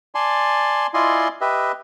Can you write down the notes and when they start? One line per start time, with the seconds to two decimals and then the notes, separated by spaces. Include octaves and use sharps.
0.15 D5 G#5 A5 C6
0.94 E4 F4 D5 D#5 G#5 C6
1.41 G4 B4 D#5 E5